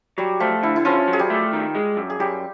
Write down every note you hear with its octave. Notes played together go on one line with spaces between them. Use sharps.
F#3 G3 G4
F3 A3 F4
D3 E4
E4
F3 C#4 F4
F#3
G#4
G3 G4
A3
D#3
G#3
F#2
G#4
F#2 G3 G4